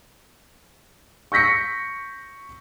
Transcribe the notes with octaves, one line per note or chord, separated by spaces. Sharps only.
C#6 G6 A#6 B6 C#7